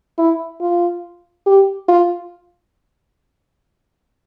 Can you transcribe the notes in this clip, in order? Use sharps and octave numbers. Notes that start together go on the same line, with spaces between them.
E4
F4
G4
F4